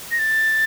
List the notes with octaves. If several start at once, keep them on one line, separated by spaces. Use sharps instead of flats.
A#6
A6